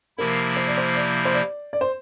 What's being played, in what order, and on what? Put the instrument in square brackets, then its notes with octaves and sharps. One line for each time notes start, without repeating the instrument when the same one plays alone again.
[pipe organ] C3 F3 A#3 E4 [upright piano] A#4
[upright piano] C5
D5
C5
D5
C5
D5
D5
C5